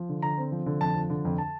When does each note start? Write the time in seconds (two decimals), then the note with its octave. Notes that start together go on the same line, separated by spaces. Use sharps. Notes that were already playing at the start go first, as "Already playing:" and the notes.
Already playing: F3
0.09 D3
0.22 D3 A#5
0.38 C4
0.52 F3
0.66 D3
0.81 F2 A5
0.96 F3
1.10 D3
1.25 F2
1.38 A5